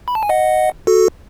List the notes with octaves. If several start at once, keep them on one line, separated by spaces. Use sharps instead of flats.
B5
A5
G#5
D#5 F#5
F#4 A4